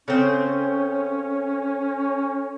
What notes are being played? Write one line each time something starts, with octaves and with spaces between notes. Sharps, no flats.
C#3 C4 C#4 A4 C#5